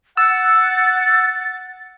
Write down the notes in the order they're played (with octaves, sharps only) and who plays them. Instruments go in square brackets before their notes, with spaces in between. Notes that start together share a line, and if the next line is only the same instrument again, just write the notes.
[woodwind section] F#5 [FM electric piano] E6 [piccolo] A6